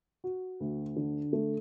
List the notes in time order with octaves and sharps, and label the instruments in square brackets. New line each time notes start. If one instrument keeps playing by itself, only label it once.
[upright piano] F#4
D2
D3
A3